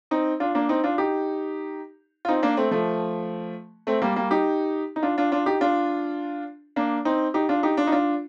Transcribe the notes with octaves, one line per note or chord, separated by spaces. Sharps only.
C4 D#4
D4 F4
A#3 D4
C4 D#4
D4 F4
D#4 G4
F4
C4 D#4
A#3 D4
A3 C4
F3 A3
A3 C4
G3 A#3
G3 A#3
D#4 G4
D#4
D4 F4
D4 F4
D4 F4
D#4 G4
D4 F4
A#3 D4
C4 D#4
D#4 G4
D4 F4
D#4 G4
D4 F4
D#4
D4 F4